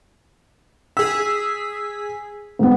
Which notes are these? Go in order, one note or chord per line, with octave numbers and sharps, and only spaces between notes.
G#4 E6 B6
G#2 B3